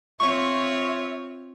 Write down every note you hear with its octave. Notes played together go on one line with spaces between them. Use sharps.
C4 F4 C#5 E5 C#6